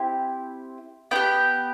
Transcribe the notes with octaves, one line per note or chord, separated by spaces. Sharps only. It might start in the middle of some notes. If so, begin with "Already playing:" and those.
Already playing: C4 E4 G4
B3 E4 G4 G5